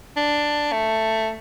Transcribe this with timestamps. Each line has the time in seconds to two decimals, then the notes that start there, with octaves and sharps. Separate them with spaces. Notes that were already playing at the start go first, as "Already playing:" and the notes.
0.17 D4
0.72 A3